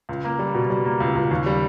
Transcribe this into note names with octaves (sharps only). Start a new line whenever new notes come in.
C#2
A#3
G3
B2
G3
A#3
C#2
C#2
D#2
G3